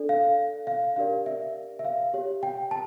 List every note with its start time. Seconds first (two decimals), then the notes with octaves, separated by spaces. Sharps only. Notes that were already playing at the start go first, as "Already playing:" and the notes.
Already playing: D4 A4 D5
0.09 F5
0.67 F5
0.96 D4 G4 A#4 D5 F5
1.26 E5
1.79 E5
1.84 F5
2.14 G4 C#5
2.43 G5
2.71 A5